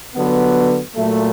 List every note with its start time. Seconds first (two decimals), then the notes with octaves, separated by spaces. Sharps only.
0.15 D3 F#3 B3
0.96 A#2 F#3 A3